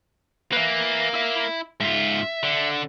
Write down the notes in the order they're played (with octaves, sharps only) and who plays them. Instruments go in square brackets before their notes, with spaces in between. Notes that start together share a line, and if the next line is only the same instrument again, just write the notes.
[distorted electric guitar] A#3 [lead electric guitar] B4 E5
[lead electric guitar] E4 E5
[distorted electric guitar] G#2 F4 [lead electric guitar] E5
[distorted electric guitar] D3